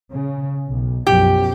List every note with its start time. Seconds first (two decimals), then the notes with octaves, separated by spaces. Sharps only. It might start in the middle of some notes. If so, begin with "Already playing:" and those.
0.12 C#3
0.66 B1
1.07 B1 F#2 F3 G4